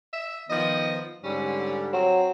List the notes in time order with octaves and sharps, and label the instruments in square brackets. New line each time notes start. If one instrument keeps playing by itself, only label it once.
[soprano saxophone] E5
[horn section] D#3 F3 B3 [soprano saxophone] D#5
[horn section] G#2 D3 G3 [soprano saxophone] C#4
[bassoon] F#3 [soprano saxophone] C4